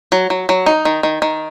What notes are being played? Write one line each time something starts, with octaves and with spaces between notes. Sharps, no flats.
F#3
F#3
F#3
D#4
D#3
D#3
D#3